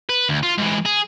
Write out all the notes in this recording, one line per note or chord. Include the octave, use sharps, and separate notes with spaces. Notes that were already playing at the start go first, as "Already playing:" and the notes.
B4
D2
F4
G#2 E3
G#4